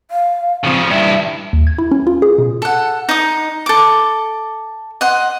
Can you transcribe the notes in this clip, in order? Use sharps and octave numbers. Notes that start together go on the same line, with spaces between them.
F5
C#3 F3 C4
G2 E4 E5
D#2
G#6
E4
C#4
F4
G#4
B2
A4 F#5
D#4 D#6
A4 D6
D#5 F#5 C6